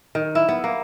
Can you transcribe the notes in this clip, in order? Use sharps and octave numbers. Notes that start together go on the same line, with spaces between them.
D#3
E4
B3
A#3